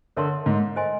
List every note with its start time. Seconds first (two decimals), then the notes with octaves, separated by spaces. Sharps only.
0.17 D3 A#4 C#5 E5 A5 C6
0.46 G#2
0.76 A4 C5 D#5 G#5 C6